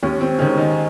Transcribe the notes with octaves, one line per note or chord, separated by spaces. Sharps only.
D#2 C#4
C4
D#3 G#3 C#4
D#4